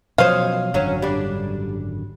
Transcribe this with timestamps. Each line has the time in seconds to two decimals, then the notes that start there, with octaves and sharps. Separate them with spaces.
0.18 B2 F3 F#3 C#4 C5 D#5 F5
0.74 G#1 F#2 D3 F#3 C#4 C#5
1.02 G3 D4